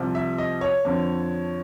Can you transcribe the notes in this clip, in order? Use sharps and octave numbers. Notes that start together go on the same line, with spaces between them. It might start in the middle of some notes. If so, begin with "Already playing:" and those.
Already playing: C2 C3 F3
E5
D#5
C#5
F2 D3 F3